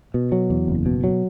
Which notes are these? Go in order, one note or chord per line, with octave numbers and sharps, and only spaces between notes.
B2
F#3
E2
F#1
B2
F#3